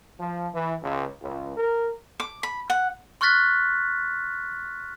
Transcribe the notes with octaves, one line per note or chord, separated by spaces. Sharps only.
F3
E3
C#2
C#2
A#4
D6
B5
F#5
C6 C#6 F6 F#6 A6 B6